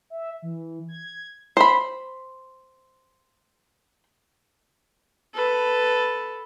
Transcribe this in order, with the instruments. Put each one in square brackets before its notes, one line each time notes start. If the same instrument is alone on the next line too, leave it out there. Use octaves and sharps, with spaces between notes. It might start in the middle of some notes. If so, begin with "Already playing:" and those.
[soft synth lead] E5
E3
G#6
[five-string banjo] C5 B5
[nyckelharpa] A4 B4